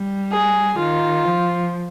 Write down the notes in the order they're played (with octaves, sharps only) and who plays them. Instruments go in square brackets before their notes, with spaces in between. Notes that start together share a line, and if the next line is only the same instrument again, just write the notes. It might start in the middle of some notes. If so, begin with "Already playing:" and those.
Already playing: [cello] G3
[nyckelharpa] G#4
[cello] D#3 [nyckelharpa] F4
[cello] F3